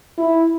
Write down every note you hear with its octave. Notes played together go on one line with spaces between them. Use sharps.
E4